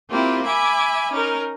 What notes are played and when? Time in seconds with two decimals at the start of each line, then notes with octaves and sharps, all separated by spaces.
0.11 A#3 C4 E4 F4 G4
0.46 E5 G#5 B5 D6
1.12 C#4 D#4 A#4